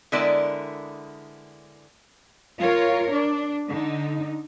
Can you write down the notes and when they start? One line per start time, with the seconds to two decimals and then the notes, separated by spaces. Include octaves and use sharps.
0.12 D3 G#3 B3 E4 A#4 D5
2.59 F4 A#4 C#5
3.13 D4
3.69 D3 D#4